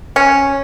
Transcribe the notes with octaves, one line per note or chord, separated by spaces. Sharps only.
C#4